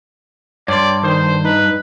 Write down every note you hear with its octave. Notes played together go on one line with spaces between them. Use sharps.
G2 C#5 D5 C6
D#3 C5
D#4 B4